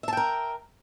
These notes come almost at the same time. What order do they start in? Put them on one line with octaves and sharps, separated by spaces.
E5 A5 G5 A#4